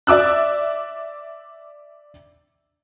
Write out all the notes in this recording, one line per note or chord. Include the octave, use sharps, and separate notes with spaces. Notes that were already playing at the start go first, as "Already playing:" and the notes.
D5 E5 D6 E6 F#6